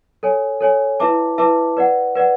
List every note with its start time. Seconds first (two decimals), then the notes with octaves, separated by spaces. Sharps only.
0.23 A4 C#5 G#5
0.61 A4 C#5 G#5
1.00 E4 B4 E5 A5 D6
1.38 E4 B4 E5 A5 D6
1.77 B4 D5 F#5
2.16 B4 D5 F#5